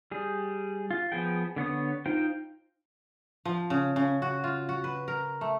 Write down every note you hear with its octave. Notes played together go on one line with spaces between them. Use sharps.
G3 G#4
F4
F3 B3 G#4 G5
D3 B3 C#5 D#6
D#4 F4 C5 G5
F3
C#3
C#3
F#4
F4
F#4
B4
A#4
A3